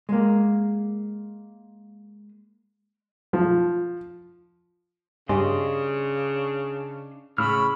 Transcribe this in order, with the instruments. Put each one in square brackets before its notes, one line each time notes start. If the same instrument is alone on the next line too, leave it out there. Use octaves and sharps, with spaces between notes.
[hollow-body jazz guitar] G#3 A#3
[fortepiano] F3
[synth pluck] G2 C#4 G4 [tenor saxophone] C#3 [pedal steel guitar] D4 D#5 C6
[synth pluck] A2 [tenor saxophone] C#3 [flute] B5 [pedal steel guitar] C#6 E6 F6